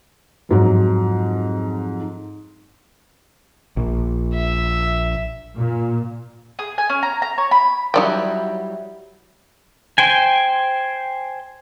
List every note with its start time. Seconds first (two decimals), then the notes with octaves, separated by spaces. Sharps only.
0.49 F2 G#2 F#3
3.77 A#1
4.35 E5
5.55 A#2
6.59 G#4
6.78 G#5
6.89 C#4
7.03 A#5
7.22 A#5
7.38 C#5
7.51 B5
7.94 F#3 G3 D#4 E4 D5 G5
9.98 C5 G5 G#5